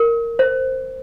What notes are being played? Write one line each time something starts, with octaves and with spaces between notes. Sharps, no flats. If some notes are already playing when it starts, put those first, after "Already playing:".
Already playing: A#4
C5